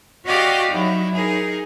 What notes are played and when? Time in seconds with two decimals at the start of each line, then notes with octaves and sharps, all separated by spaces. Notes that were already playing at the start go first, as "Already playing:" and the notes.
0.25 F#4 G4 D5 D#5 F5
0.71 F#3 D#4 E4
1.13 D#4 G#4 A#4